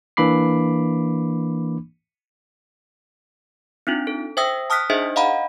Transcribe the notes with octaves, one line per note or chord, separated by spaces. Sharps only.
E3 A#3 D4 B5 D6 C7
C4 D4 D#4 F4
A4
C5 E5 G5 D#6 E6 A#6
A5 D#6 F6 F#6 B6
D4 D#4 G#4 C5 D#5 E5
D#5 F5 F#5 A#5 B5